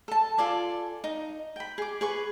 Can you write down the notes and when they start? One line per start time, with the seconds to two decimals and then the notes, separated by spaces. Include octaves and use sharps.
0.08 A4 A5
0.38 F4 A4 D5 G#5
1.04 D#4
1.56 G5 B5
1.78 G#4 D6
2.01 G#4 B4 C#6